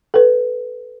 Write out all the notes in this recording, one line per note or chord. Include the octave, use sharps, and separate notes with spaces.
A4 B4